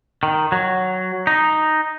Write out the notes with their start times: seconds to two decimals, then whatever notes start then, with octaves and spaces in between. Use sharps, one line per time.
0.23 D#3
0.52 F#3
1.27 D#4